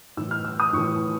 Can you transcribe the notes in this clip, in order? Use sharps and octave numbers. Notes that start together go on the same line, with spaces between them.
A2 E3 E6
F6
E6
D#6
A2 E3 C#6